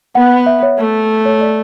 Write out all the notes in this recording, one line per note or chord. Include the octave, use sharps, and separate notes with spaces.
B3 F#5
E5
C#5
A3
C#5
D5